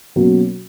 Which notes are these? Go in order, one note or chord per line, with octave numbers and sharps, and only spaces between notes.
B2 F#3 A#3 C#4 F#4